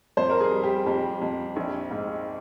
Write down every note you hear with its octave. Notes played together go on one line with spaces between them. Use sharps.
F2 C5
A#4
G#4
G3
G4
F2 G4
F2
A#1
G#2